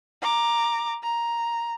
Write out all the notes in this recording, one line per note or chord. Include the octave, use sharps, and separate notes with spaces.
A#5 D6
A#5